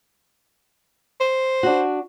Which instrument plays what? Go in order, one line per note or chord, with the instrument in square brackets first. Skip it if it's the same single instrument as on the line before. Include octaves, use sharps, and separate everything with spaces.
[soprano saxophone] C5
[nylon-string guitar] D4 F#4